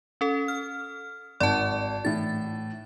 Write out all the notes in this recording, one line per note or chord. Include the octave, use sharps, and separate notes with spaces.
C#4 A4
F6
G#1 D5 A5
A2 E3 A6